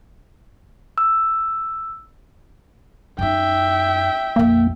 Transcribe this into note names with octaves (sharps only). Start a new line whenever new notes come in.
E6
F#2 D#4 E5 G5
A#1 F2 A#3